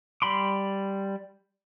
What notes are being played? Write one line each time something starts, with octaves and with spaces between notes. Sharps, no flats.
G3 B5 C6 D6